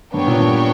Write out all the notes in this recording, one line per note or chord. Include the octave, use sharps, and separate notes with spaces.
G2 B3 D4 A#4 C#5 G5
A#2
G2